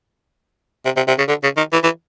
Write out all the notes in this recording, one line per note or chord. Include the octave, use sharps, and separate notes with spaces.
C3
C3
C3
C#3
D3
C#3
D#3
E3
E3